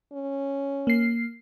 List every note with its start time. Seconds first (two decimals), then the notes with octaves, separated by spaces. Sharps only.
0.13 C#4
0.87 A#3 C7